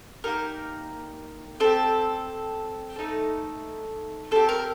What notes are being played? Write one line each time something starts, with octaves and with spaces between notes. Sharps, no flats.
A#3 D#4 G4 A#4
C4 G4 A4
A3 D#4 A4
C4 G4 A4
A#4